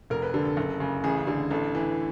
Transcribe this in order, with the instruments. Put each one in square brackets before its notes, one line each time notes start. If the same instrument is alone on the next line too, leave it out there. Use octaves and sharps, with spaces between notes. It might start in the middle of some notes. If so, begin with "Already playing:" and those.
[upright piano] F1 A#4
B4
D3 A4
A4
F#1
C#3
A1 G#4
D3
A1 A4
E3